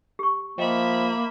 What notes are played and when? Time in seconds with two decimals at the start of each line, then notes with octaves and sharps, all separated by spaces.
0.19 G4 C#6
0.58 F3 A#3 D#5 E5 G5 B5